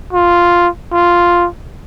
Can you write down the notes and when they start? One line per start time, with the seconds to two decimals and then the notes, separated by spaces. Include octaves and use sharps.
0.13 F4
0.92 F4